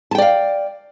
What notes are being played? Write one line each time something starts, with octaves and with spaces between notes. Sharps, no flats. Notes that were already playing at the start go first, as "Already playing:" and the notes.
D5 F5 G5 A5